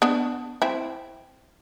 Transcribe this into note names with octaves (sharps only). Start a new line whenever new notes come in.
B3 D4
C4 E4